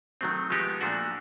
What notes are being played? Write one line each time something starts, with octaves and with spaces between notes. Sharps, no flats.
D#3 F#3 A3 C4
F3 G#3 B3 D#4 G4
A#2 F3 A3 D4 F#4